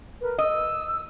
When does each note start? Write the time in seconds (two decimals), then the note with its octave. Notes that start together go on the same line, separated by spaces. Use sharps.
0.22 A#4 B4
0.38 D#5 E6